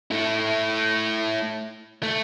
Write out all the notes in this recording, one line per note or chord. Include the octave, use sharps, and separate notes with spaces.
A3 E4
A3